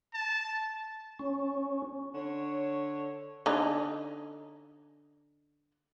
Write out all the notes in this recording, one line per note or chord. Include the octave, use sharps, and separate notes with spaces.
A5
C#4
D3 C#5
D3 C#4 D#4